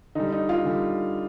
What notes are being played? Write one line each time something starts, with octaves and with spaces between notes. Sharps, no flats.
D3 G3 D#4
D#4
F4
D3 G3